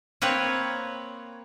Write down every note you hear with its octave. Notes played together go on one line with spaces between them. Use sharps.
A#3 C4 B4 C#5